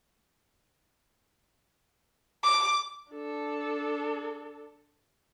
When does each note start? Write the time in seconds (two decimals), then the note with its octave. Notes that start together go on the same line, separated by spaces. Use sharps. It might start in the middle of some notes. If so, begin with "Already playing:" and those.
2.44 D6
3.12 D4 A4